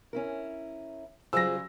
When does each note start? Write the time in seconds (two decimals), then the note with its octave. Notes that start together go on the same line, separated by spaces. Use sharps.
0.13 C#4 E4 A#4
1.33 C#3 F#3 G3 F4 G#4 C5 E6 A#6